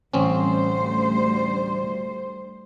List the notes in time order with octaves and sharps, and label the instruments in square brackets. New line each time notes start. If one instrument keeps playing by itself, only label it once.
[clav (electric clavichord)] A1 C4 C#4 [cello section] D2 G3 C5